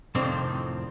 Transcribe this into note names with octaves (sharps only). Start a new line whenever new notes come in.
F2 A2 C3 D#3 C4 D4